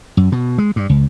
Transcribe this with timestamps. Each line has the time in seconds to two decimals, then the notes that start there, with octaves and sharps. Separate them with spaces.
0.17 F#2
0.32 B2
0.58 G#3
0.76 G2
0.89 C#2